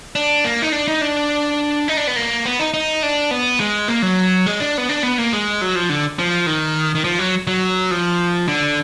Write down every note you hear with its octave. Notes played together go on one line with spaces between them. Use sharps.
D4
A#3
D#4
D4
D#4
D4
D#4
D4
B3
A#3
B3
D#4
D#4
D4
B3
G#3
A#3
F#3
G#3
D4
B3
D4
B3
A#3
G#3
F#3
F3
D3
F3
D#3
D#3
F3
F#3
F#3
F3
D3